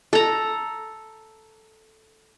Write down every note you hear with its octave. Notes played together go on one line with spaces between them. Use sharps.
A4 A#5